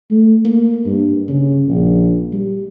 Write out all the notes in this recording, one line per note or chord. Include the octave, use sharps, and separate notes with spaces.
A3
A#3
G2
C#3
A#1
G3